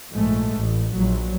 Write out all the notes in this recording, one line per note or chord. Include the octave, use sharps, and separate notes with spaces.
A#1 G#2 G#3 A3
A1
A#1 F#3